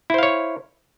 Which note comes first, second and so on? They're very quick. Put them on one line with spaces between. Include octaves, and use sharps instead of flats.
E4 C5 F5 C#5